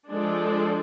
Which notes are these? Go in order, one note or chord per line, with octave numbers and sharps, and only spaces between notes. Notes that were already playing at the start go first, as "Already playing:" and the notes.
F3 G#3 D4 A4